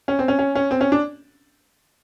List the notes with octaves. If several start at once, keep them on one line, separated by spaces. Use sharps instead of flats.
C#4
C4
C#4
C#4
C#4
C4
C#4
D4